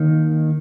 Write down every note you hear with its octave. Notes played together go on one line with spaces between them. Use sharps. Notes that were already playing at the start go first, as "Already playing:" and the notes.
Already playing: D#2 D#3